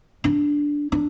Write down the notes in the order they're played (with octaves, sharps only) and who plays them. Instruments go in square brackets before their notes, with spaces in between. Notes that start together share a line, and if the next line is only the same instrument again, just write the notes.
[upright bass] D4
D4